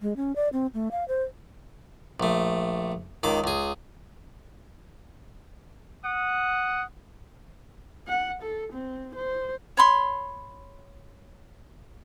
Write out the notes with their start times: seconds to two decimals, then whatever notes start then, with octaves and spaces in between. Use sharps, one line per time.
0.01 G#3
0.17 C#4
0.36 D5
0.53 C4
0.74 A3
0.91 F5
1.08 C5
2.20 A#1 A3
3.23 C#2 D#3 D6
3.44 C#2 G#4
6.04 F#5 D#6
8.08 F#5
8.43 A4
8.73 C4
9.15 C5
9.77 C#5 B5 C6